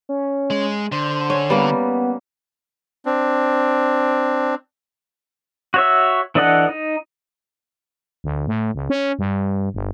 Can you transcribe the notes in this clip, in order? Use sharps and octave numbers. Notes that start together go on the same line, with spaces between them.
C#4
G#3
D3 C5
C#4
G3 A#3 B3
C4 D4
F#4 C#5 E5
E3 D4 A4 D#5 F#5
D#4
D2
A2
C#2
C#4
G2
G1